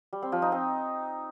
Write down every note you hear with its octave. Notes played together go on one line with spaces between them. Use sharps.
G3
C4
F3
D#4
C4